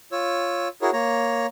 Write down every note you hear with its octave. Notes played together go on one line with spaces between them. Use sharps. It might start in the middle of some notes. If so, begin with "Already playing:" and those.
F4 C#5 E6
E4 F#4 G#4 A#4 C#5
A#3 C#5 A#5